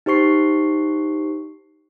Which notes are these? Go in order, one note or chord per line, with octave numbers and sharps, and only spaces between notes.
D#4 G4 C5 C#6 C7